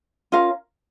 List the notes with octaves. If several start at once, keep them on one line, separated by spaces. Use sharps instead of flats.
C#4 F4 A#4 F5